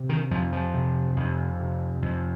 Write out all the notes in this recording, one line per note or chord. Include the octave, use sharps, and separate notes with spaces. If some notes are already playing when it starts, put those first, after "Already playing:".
Already playing: C3
D#3
F2 F3
F3
C3
F2
C3
F2